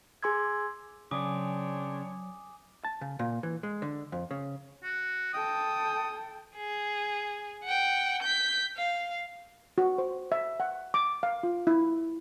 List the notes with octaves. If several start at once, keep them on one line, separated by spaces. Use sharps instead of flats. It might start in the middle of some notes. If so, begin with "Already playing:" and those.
G#4 G#5 C6 D6 E6 G#6
C#3 F#3 C4 D4 C#5 G#5 D6 D#6
A5
C#3
A#2
E3
G#3
D3
F2
C#3
F#4
A4 G5 D#6
G#4
F#5 G5
G6 B6
F5
F#4
C5
E5
F#5
D6
F5
F4
E4